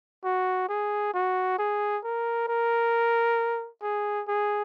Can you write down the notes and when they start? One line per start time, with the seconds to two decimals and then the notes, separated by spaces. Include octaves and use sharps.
0.24 F#4
0.69 G#4
1.14 F#4
1.58 G#4
2.04 A#4
2.48 A#4
3.82 G#4
4.28 G#4